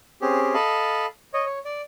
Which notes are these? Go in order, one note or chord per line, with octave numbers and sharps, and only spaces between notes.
C4 C#4 G4 G#4
A4 D#5 F5 A5 B5
C#5 D#5
C#5
D5